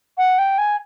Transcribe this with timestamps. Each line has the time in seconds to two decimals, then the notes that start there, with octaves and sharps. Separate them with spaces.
0.18 F#5
0.38 G5
0.58 G#5